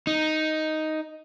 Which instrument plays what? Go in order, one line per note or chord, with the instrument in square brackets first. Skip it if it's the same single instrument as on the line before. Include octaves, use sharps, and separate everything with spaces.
[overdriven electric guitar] D#4